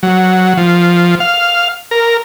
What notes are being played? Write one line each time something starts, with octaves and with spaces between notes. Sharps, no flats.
F#3
F3
F5
A#4